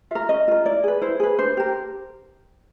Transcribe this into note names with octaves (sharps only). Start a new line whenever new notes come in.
F4 A#4 E5
C#4 D#5
F4 A#4
E4 D5
G#4 B4
E4 C5
G#4 B4
D4 C5
G4 A#4